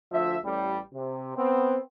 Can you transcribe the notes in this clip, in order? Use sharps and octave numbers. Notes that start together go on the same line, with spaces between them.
D2 F3 E5
A1 G3
C3
B3 C4